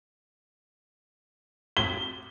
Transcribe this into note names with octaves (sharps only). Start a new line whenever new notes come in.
G7